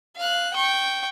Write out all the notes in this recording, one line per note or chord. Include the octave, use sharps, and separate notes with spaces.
F5 F#6
G5 C#6